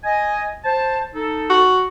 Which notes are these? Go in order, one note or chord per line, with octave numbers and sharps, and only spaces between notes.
D#5 G#5
C5 A5
D#4 A4
F#4